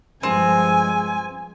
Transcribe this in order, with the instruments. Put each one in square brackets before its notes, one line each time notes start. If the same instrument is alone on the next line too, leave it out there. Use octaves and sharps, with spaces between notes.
[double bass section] G2 F3 G#3 [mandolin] C4 [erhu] G#5